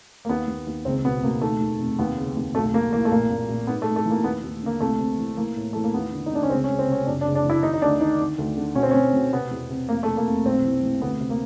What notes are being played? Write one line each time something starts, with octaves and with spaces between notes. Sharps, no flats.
A#3
D#2 B3
D#2
D#2
C#2 C4
B2 B3
B2 A#3
D#3 A3
D#2
F1
D#2 B3
C#3
D#2
B1 A3
B1 A#3
E3 A#3
A3
A#2 A#3
A#2
A#2
G#2 B3
A3
G#2
A3
E3
A#3
D#2 B3
D#2
D3 A#3
C2 A3
C3
E3
E3 A#3
A2
E3 A3
A#3
D#2 B3
D3
D#4
D3 D4
C#4
C#2 C4
C#4
C#2
C4
C3 C#4
F#1 D4
D4
C#3
D4
E3
E4
D#3 D#4
D#4
D2 D4
D#3 D#4
D3
D2
D3
B2 C#4
C4
B2 C#4
B2
C3 B3
E2
C3
F1 A#3
A3
F1
A#3
F1
B1 C4
E3
E3
D2 B3
C3
A#3